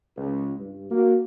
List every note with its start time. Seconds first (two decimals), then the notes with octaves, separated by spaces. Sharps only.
0.17 C#2
0.59 G2
0.91 A#3 F#4